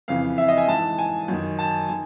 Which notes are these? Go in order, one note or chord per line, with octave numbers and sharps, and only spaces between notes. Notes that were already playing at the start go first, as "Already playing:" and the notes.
F2 C#3 E3 F5
E5
D#5
G#5
G#2 E3 A5
G#5
F#2 D#3
A5
D#3 G#5